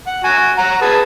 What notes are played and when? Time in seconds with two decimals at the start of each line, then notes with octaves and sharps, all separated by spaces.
0.07 F#5
0.24 F#4 G#5
0.58 F#4 F#5 A#5
0.81 G#4 B4 A5